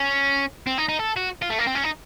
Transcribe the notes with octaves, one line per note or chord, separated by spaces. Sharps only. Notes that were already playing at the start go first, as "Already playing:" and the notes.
Already playing: C#4
C4
D#4
D#4
A4
F#4
F4
A3
A#3
C4
C#4
D#4